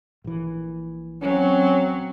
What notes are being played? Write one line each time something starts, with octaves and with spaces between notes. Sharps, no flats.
A#1 E3
F#3 C4 C#4